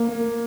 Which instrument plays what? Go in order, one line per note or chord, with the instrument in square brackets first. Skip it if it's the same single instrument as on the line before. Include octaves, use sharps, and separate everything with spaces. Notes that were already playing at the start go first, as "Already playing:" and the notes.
Already playing: [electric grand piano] A#3